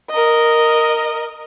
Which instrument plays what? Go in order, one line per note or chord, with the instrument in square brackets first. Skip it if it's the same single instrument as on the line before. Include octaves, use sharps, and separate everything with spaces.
[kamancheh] A#4 D#5